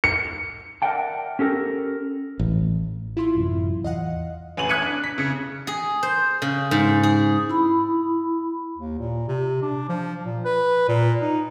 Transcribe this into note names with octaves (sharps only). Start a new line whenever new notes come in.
C#7
A#4 D5 E5 F#5 G5 A5
C#4 G4 A4 A#4
A1
E4 F4 C6
A1 F#2 C3
E2 D#5 F5 F#5
A1 G#5 D#7 F#7
D#6 F#6 G#6 B6 C#7 D#7
D4
B6
C#3 C#7
G#4
C5
C#3
G#2
G#4
E4 B5
D#2
A#2
C3
D4
F3
A#2
B4
A#2
D#4